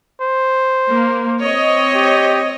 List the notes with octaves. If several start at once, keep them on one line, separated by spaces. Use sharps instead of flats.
C5
A#3
C4 C#5 D#5
G4